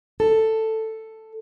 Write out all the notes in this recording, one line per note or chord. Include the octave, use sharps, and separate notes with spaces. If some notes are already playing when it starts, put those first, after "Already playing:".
A4